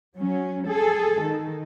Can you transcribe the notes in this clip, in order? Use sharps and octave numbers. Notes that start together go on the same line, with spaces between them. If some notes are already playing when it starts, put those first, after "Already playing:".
F#3 C#4
G#4 A4
D#3